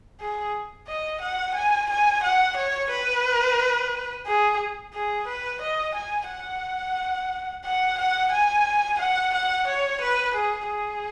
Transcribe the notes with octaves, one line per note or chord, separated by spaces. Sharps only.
G#4
D#5
F#5
G#5
G#5
F#5
C#5
B4
G#4
G#4
B4
D#5
G#5
F#5
F#5
F#5
G#5
F#5
F#5
C#5
B4
G#4
G#4